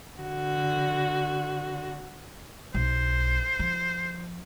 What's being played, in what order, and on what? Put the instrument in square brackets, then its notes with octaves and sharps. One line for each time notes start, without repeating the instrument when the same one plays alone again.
[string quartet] D3 F#4
[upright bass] B1 [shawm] C5
[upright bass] F3